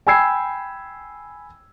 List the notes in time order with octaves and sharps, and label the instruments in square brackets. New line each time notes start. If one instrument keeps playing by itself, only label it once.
[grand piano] G5 G#5 B5 E6 G#6 C7